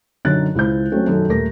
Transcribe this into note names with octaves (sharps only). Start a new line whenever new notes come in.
F#2 D3 D#4 C#5 F#6 A6
C#2 E4 C5 G6
F#3 A3 C4 C#4
F#2 D#3 A4
D#1 A3 A#4 A#6